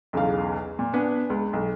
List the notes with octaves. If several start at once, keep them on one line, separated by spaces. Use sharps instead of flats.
B1 E2 C#3 F5
A#2
B3 D4 B4 G#5
C#2
B1